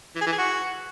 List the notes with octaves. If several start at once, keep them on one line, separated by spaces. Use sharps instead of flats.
E3
G#4
E3
G#4
F#4